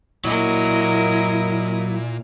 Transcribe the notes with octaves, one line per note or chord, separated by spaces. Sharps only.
A#2 F#3 E4 A#4 D#5